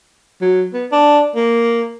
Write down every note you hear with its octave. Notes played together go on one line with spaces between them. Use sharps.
F#3
B3
D4
A#3